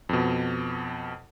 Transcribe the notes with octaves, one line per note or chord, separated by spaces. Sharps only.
F2 B2